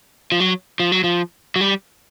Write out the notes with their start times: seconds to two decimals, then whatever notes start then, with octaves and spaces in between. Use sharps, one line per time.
0.32 F3
0.40 F#3
0.80 F3
0.92 F#3
1.04 F3
1.56 F#3
1.61 G3